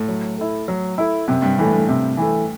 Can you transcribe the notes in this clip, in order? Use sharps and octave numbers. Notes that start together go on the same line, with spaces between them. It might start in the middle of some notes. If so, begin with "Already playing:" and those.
Already playing: A2
F#3
A3 E4
F#3
A3 E4
F#2 C3
G2
A2 E3 A3
G2
C3
E3 A3